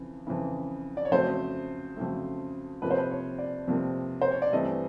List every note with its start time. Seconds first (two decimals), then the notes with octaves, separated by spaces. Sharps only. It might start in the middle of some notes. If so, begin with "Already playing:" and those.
Already playing: F2 C#3 E3
0.27 F2 C#3 E3
0.97 D5
1.05 C#5
1.11 F2 C#3 F#3 A3 C5
1.96 F2 C#3 F#3 A3
2.82 F2 C3 F3 A#3 B4
2.91 C5
2.98 B4
3.11 C#5
3.39 D5
3.68 F2 C3 F3 A#3
4.21 C5
4.31 C#5
4.42 D5
4.53 G2 E3 A3 C4 D#5